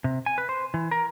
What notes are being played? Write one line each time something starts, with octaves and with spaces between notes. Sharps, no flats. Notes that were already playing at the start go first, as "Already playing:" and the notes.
C3
G#5
B4
C5
E3
A#4